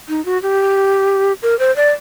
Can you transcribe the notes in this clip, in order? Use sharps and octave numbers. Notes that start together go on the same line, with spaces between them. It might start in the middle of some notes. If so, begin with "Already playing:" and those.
D#4
F#4
G4
A#4
C5
D5